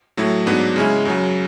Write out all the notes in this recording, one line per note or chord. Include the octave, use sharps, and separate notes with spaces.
A2 F#3 A3 E4
G#2 F#3 B3 D4
C#3 G#3 C#4 E4
F#2 C#3 F#3